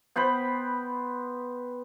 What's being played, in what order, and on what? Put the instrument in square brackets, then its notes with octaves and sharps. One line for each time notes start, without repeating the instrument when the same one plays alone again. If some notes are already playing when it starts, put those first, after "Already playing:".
[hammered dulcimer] B3 C5 G5 B5